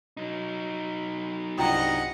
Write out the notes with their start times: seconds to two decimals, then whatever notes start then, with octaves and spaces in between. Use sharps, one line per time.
0.17 F#3 D#4
1.58 C2 G2 F4 D#5 F#5 G5 A#5